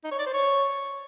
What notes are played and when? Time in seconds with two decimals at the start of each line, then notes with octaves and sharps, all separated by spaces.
0.04 D#4
0.11 C#5
0.19 D5
0.26 C5
0.34 C#5